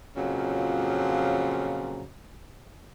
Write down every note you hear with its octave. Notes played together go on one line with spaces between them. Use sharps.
F2 A#2 C#3 F3 F#3